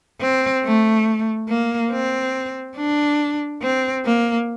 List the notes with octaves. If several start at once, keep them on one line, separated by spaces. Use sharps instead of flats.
C4
A3
A#3
C4
D4
C4
A#3